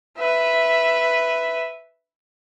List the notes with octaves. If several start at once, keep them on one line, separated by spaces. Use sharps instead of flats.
B4 E5